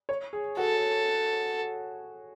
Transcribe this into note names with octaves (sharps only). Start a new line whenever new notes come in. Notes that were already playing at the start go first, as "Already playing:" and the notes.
C#5
G#4
F#4 A4